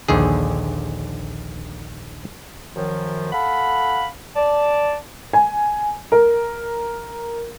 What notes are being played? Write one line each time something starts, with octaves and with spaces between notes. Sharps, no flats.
A#1 D#2 D3 G#4
F#2 D#3 F3
A4 F5 F#5 B5
D5 A5
G#5
A#4